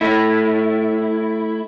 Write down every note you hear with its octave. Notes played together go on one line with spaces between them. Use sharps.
A3 E4